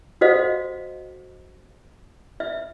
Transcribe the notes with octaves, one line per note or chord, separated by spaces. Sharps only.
F#4 A4 C5 D#5 F5 F#5
E5